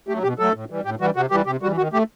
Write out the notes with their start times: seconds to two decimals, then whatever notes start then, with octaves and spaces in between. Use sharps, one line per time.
0.08 F#3 A3 G4
0.23 B2 G4
0.39 F#3 A3 A4
0.55 A2
0.70 E3 G3
0.85 A2 G4
1.00 E3 G3 F#4
1.16 C3 F#4
1.31 E3 G3 G4
1.46 C3 G4
1.62 G3 F#4
1.66 E3
1.77 D#3 F#4
1.93 A3 G4